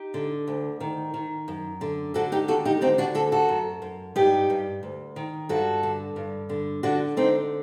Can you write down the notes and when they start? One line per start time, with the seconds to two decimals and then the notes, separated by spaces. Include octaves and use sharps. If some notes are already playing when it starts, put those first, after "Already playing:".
Already playing: D#4 G4
0.14 D3
0.47 D2
0.80 D#3
1.14 D#3
1.48 F#2
1.81 D3
2.14 D3 F#4 A4
2.32 D#4 G4
2.48 D#2 F#4 A4
2.65 D#4 G4
2.81 D3 C4 D#4
2.98 D4 F#4
3.15 D2 F#4 A4
3.32 F#4 A4
3.49 F#2
3.82 F#2
4.16 G2 D#4 G4
4.50 G2
4.83 D2
5.16 D#3
5.49 G2 F#4 A4
5.83 D3
6.16 G2
6.49 D3
6.83 D3 D4 F#4
7.17 D3 C4 D#4